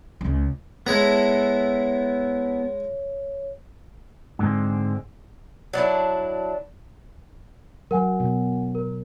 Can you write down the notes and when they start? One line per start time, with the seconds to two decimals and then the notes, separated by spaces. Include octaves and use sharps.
0.21 C#2
0.86 G#3 B3 E4 G#4 A4 C#5 A#5
4.39 G#2 D3 G#3 C4
5.73 F#3 D4 E4
7.91 F#3 A#4 F#5 G#5
8.20 B2
8.75 A#4